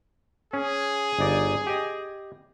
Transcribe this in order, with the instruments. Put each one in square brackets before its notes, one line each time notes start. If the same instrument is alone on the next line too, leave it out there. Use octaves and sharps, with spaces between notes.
[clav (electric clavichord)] C#4 [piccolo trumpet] G#4
[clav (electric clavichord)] G1 D#4 D5
G4 D#5